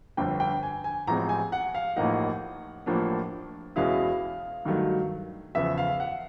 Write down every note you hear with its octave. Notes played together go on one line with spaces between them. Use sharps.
G1 F2 D3 G5
G5
G#5
G#5
A1 A2 F3 G#3 C4 A#5
G#5
F#5
F5
A1 A2 F3 A#3 D#4 F#5
A1 A2 F3 A#3 D4
E2 B2 G#3 C#4 E4 F5
G2 D#3 F#3 A3
E2 C#3 F3 E5
F5
F#5